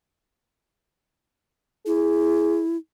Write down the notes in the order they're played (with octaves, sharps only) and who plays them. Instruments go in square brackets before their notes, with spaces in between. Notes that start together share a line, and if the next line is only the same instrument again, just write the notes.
[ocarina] E4 [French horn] G#4